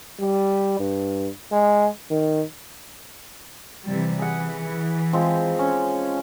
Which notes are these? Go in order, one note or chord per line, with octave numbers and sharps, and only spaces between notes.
G3
G2
G#3
D#3
C3 E3 G3
E3 G#4 F#5
F3 G#3 C4
C#4